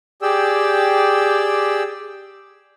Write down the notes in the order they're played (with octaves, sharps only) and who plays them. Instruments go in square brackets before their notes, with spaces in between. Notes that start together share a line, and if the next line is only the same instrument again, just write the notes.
[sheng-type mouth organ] G4 G#4 D5 G5 E6